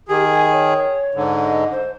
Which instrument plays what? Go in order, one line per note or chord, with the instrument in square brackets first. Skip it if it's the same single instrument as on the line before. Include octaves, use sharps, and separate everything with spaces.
[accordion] D#3 G#4 [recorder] G4
[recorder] G#5
C#5
[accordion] G#2 D3
[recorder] D#5
C5